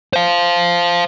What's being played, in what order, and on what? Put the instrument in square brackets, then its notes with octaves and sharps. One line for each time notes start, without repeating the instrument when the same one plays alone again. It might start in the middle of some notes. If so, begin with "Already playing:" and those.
[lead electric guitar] C5 F5